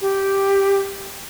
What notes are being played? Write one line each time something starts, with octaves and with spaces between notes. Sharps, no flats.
G4